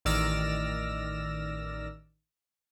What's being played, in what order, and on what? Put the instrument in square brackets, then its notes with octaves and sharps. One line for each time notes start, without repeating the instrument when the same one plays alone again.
[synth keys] A1 D#3 D5 E6 F6 A#6